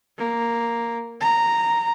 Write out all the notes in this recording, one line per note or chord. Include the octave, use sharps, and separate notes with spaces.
A#3
A#5